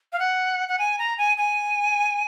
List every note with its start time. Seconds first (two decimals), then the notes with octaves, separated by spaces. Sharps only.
0.13 F5
0.20 F#5
0.68 F#5
0.79 G#5
0.99 A#5
1.18 G#5
1.37 G#5